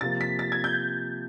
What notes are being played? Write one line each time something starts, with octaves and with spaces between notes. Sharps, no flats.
C3 F3 A#3 A6
B6
A6
G#6
G6